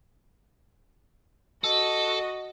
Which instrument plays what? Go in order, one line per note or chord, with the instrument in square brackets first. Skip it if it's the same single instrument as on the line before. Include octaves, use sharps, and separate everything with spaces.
[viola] F#4 D#5 [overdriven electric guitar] A4